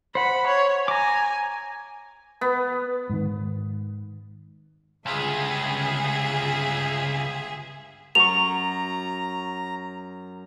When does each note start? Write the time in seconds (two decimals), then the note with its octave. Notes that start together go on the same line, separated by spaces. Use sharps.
0.15 C5 F#5 B5
0.47 C#5
0.88 G#5 A#5 D6
2.41 B3
3.10 G#2 D#3
5.06 G1 C#2 G#4 E5
8.15 F#2 A#5 C#6 F7